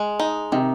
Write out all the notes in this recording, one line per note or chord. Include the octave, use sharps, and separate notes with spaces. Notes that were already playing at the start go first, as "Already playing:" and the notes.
Already playing: G#3
D#4
C3 D#3